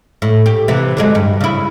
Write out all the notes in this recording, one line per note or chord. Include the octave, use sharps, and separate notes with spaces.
A2
G4
C3 E3
D3 F#3 G#3
G2
C#3 E4